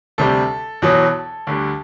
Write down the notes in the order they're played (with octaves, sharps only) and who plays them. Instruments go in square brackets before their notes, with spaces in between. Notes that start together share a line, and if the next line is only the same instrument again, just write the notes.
[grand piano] D2 C3 G3 A4
E2 B2 F#3
D2 D3 G3